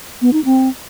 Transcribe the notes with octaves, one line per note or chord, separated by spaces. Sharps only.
B3
D#4
C4